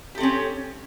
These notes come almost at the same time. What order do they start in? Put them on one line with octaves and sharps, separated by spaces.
G4 A4 C4 C#4